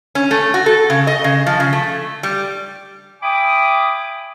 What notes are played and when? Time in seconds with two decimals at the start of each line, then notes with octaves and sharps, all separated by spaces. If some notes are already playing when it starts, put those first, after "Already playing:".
0.15 C#4
0.31 A3
0.54 F#4
0.66 A4
0.90 C#3
1.07 D#5
1.24 C#3
1.47 F3
1.60 C#3
1.73 A3
2.23 G3
3.23 E5 G5 G#5 B5 D6 D#6